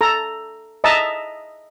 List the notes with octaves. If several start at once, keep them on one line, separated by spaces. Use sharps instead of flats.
A4 A#5
D#5 E5 A5 A#5